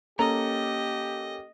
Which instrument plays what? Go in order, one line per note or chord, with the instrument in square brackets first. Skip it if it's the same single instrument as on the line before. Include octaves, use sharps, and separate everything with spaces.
[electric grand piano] A#3 C#4 A4 [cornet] G4 [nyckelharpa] D#5 [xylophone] A#5